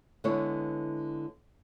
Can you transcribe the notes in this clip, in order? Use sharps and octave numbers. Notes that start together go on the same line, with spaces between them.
D3 G#3 B3 E4 C#5